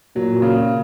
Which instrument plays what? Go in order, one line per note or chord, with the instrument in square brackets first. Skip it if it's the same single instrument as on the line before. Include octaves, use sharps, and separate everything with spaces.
[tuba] A#2 [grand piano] F#3
[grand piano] C#3